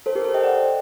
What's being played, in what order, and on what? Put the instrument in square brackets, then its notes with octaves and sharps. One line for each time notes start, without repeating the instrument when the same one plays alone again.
[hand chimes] A4 C5
G4 A#4
A4 C5
D#5 G5
D5 F#5